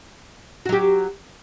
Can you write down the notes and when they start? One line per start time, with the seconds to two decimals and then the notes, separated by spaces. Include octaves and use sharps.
0.66 F#4
0.69 F#3
0.72 G4